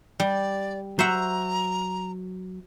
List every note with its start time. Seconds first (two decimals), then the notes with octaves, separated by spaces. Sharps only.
0.20 G3 D5
0.99 F#3 C5 E5 F#5 A#5